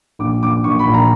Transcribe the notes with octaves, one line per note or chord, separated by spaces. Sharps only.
A#1 D6
A#1 D6
A#1 C#6
B5
A#1
A#5